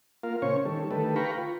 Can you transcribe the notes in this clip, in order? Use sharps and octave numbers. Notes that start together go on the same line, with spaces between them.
A#3 F4 A#4 F5
A#2 C#3 C#4 C5 C#5 C#6
D#3 G3 A4
D3 D#3 A3 G4 A4 B4
B4 F5 G5 A#5 B5 C#6
F4